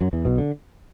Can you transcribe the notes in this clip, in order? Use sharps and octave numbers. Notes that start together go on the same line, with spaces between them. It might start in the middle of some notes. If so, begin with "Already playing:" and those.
F#2 F#3
E2 E3
B1 B2
D3